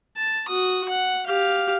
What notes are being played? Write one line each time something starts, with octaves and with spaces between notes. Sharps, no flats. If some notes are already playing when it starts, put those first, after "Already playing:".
A5
F#4 D#6
F#5
G4 F5